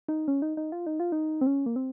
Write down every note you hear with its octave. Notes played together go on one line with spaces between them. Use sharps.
D#4
C#4
D#4
D#4
F4
D#4
F4
D#4
C4
C#4
A#3
C4